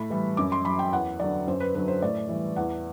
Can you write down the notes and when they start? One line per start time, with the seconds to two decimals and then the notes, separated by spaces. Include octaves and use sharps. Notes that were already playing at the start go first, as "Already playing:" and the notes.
Already playing: A2 B5
0.10 E3 G3
0.37 F#2 D6
0.52 C6
0.65 F#3 B5
0.79 G5
0.92 E2 F#5
1.20 D3 F#3 D5
1.47 F#2 C5
1.60 B4
1.75 D3 F#3 B4
1.88 C5
2.02 A2 D5
2.29 E3 G3
2.56 E2 F#5